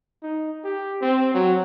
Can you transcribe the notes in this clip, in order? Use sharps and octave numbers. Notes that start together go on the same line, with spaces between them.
D#4
G4
C4
F#3